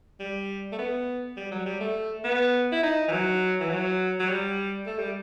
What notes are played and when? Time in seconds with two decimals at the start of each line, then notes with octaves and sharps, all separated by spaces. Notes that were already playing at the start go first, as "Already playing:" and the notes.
0.20 G3
0.72 A3
0.78 B3
1.37 G3
1.52 F#3
1.66 G3
1.80 A3
2.24 B3
2.72 E4
2.83 D#4
3.08 E3
3.12 F#3
3.60 E3
3.70 F#3
4.20 F#3
4.29 G3
4.87 A3
4.99 G3